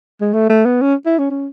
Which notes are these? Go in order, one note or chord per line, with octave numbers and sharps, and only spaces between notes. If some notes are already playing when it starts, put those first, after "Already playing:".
G#3
A3
A3
B3
C#4
E4
C#4
C#4